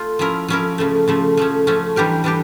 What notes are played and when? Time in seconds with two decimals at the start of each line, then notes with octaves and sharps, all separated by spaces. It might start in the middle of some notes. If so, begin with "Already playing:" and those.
Already playing: A3 F4
0.19 F3 C#4 E4 A#4
0.48 F3 C#4 E4 A#4
0.78 C#3 F3 A3
1.08 C#3 F3 A3
1.37 F3 A3 C#4
1.67 F3 A3 C#4
1.96 E3 G3 D4 G4 A#4
2.24 E3 G3 D4 G4